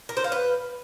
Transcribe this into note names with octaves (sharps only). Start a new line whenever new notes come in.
A#4
C5
F5
B4